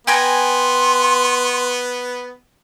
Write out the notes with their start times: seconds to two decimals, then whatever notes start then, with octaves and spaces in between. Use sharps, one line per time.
0.07 B3 G5 G#5 A#5 C6